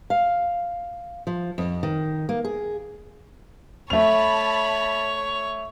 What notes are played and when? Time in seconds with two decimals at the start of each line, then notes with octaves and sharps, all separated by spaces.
0.10 F5
1.27 F3
1.58 F2
1.83 D#3
2.29 A#3
2.45 G#4
3.90 A3 C#5 A5 B5 F7